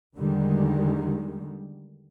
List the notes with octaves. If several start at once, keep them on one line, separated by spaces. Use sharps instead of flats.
E2 D3 D#3 G3 G#3